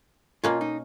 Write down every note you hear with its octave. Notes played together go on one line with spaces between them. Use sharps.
B2 A#3 C#4 F4
D#4